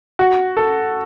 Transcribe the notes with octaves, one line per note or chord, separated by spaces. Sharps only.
F#4
A4